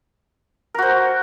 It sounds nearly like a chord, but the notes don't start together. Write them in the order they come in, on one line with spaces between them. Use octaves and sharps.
A#4 F#4 C5